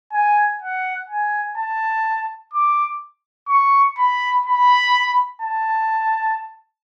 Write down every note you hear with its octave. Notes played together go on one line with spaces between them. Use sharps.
G#5
F#5
G#5
A5
D6
C#6
B5
B5
A5